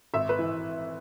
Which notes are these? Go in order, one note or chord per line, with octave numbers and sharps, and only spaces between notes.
G#1 E5
B4
E3